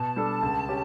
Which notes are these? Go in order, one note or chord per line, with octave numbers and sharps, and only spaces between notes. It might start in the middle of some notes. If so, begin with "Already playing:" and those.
Already playing: B2 A5
G3 D4 A4
C#2
C#4 G4